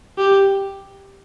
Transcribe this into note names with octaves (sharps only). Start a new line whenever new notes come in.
G4